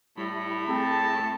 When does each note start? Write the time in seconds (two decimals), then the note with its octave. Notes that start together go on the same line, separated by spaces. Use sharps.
0.18 A2 G3 E4 B5
0.69 A3 C4 G#4 A5